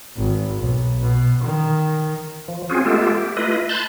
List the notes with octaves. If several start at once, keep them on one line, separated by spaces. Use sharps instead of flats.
G#1
B1
B2
D#3
F3
C4 C#4 F4 F#4 G#4
G#3 A3 B3 F4 G4 A4
G4
A3 E4 F4 B4 D#5
A5 B5 C6 F#6 G6 A6